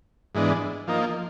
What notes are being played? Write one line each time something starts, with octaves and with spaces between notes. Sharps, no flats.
G#2 E3 G#3 B3 D4
F3 A#3 D#4